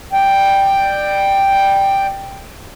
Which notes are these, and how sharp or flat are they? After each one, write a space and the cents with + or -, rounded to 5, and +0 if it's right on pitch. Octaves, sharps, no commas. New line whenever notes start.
D5 +20 G5 +0